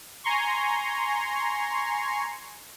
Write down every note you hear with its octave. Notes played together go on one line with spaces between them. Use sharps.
G#5 A#5 C6 C#6